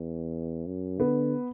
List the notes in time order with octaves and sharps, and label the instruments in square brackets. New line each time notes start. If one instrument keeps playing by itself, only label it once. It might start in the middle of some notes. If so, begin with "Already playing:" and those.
Already playing: [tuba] E2
F#2
[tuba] D3 [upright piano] B3